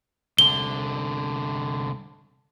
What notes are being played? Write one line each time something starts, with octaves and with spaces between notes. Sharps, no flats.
C2 D3 G7